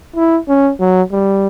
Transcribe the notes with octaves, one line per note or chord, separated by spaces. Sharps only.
E4
C#4
F#3
G3